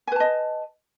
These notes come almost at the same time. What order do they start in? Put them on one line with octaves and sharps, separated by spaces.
G#5 B4 A5 D#5